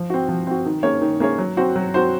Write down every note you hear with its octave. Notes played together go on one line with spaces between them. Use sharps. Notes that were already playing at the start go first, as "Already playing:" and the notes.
Already playing: F3
C4 F#4
F3
C4 F#4
D#3
A#3 C#4 G#4 C#5
D#3
A#3 C#4 G#4 C#5
F#3
C4 F#4 C5
F#3
C4 F#4 C5